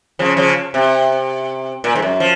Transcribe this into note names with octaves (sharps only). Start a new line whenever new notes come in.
C#3 F3
C#3 F3
C3
A#2
G#2
F#2
F3